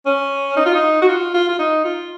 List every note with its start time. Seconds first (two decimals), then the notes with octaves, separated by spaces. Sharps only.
0.06 C#4
0.57 D#4
0.66 F4
0.75 D#4
1.02 F#4
1.08 F4
1.34 F4
1.49 F4
1.59 D#4
1.85 F4